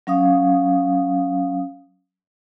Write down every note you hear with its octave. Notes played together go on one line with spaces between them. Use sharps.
F#3 C#4 F5 D#6